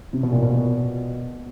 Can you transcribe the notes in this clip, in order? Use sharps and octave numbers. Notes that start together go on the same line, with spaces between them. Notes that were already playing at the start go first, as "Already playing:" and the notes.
C3
B2
A#2
B2